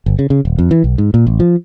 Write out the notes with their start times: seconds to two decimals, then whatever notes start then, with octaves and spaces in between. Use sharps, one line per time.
0.06 G1
0.19 C#3
0.30 C#3
0.45 D#1
0.59 F2
0.71 E3
0.84 B1
0.98 G#2
1.14 A#2
1.27 A1
1.40 F3